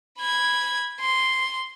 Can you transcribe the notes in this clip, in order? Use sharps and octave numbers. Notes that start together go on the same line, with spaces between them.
B5 G#6
C6